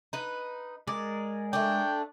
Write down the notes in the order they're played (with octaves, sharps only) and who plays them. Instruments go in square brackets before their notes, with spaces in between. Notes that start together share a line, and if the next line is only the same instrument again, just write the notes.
[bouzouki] D#4 B4
[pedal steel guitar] G#3 G#4 A#4 [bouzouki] D5
[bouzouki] A3 D4 [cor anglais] G5